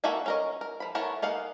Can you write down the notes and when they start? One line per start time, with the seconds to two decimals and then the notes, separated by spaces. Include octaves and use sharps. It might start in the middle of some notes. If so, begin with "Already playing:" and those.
0.04 A#3 F#4 A4 E5 G#5
0.26 C#4 A#4 D#5
0.61 A#4
0.80 F3 B5
0.95 A3 B3 E4 A#4 C#5
1.22 A#3 D#4 F5 F#5